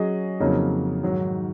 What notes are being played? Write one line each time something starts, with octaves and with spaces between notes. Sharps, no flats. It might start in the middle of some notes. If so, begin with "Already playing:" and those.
Already playing: F#3 C#4 G#4 D#5
F2 C#3 F#3 A#3 D#4
G#2 D#3 F#3